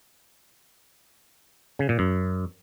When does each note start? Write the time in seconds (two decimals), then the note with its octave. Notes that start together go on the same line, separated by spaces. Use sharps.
1.79 C#3
1.89 A#2
1.99 F#2